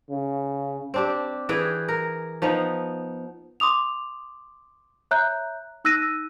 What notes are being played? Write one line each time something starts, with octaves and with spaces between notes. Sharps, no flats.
C#3
C4 D4 G4
E3 G#4 B4 G5
A#4
F3 B3 D#4
C6 D6 D#6 F7
C#5 E5 A#5 F#6 G6
D#4 E6 F#6 A#6 D#7